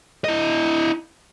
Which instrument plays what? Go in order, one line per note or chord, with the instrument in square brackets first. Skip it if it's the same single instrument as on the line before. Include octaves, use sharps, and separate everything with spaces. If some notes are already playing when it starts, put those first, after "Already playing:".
[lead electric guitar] E4 D#5